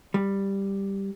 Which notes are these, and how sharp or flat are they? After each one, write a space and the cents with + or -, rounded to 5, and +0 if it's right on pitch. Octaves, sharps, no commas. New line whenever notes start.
G3 +5